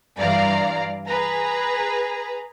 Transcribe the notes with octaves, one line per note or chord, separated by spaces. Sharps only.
G2 E3 D5 F5 A#5
G#4 B4 A#5